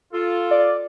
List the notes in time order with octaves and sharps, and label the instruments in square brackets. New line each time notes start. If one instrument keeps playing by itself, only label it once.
[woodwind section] F4 A4
[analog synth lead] D5